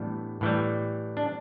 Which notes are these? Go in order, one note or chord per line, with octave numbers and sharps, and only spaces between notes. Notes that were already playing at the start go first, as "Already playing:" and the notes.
Already playing: A2 E3 G3 B3 D4
A2 E3 G3
D4